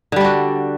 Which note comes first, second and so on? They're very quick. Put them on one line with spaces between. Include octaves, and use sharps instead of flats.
D3 G3 D4 F#4